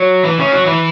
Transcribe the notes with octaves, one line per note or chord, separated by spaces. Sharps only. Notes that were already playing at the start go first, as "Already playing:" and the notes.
Already playing: F#3
E3 E4
C#3 C#4
F#3 F#4
E3 E4